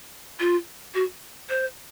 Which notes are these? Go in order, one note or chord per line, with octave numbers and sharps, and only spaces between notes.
F4
F#4
C5